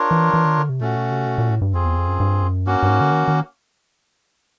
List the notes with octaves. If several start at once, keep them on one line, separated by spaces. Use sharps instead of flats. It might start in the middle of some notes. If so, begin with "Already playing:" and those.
Already playing: D4 F4 A#4 C#5
E3
E3
D#3
D3
C3
A#2 A3 C#4 F#4
B2
C3
B2
A#2
A2
G2
F2 C4 F4 G#4
E2
F2
F#2
G2
F#2
G2 A#3 C#4 F#4
G2
G#2
D3
D#3
D#3